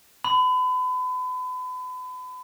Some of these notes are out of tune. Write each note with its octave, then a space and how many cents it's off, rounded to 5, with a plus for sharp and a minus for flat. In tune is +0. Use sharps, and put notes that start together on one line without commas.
B5 +35